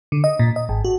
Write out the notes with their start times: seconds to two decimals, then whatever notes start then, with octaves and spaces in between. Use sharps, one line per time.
0.12 D3
0.24 D#5
0.39 A#2
0.56 D#5
0.69 G#1
0.85 F#4